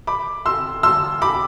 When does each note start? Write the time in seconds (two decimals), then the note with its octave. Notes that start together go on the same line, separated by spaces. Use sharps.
0.07 B5 D6
0.46 C6 E6
0.83 C6 E6
1.22 B5 D6